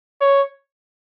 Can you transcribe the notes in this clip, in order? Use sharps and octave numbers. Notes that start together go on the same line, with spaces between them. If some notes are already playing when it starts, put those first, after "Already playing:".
C#5